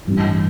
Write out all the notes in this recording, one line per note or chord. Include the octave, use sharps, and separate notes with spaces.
A1 G2 E3